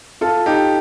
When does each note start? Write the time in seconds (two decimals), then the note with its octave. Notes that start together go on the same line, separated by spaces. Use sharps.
0.21 F4 A4
0.46 D#4 G4